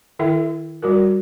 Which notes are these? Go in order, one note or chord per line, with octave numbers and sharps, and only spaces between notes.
D#3 E4 A4 E5 G5
G3 F#4 A#4